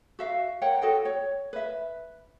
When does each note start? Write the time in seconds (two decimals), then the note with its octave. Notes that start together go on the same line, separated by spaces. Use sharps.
0.19 F#4 E5 F5
0.62 A#4 C#5 F#5 G5
0.82 F#4 A4 D#5 G5
1.05 C#5
1.53 B4 E5